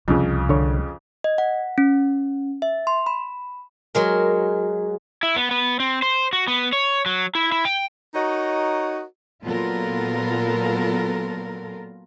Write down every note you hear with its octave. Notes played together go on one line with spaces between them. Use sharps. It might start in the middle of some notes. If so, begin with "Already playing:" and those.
C2 F2 C#3
D3 C#5
D#5
F#5
C#4
E5
C6
B5
F#3 G#3 A#4
E4
B3
B3
C4
C5
F#4
B3
C#5
F#3
E4
E4
G5
D#4 F#4 A#4 C#5 D#5
A#2 F#3 B3 F4 A4 A#4